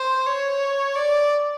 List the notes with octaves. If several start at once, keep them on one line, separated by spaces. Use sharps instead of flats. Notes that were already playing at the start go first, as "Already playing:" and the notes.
Already playing: C5
C#5
D5